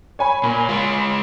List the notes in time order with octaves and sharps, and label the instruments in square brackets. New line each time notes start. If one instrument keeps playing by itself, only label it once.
[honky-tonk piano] C#5 G#5 B5
[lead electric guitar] A#2
G#3 F4